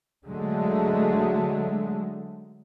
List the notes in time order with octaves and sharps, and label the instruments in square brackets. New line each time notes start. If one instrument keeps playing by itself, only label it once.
[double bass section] D3 F#3 G#3 A3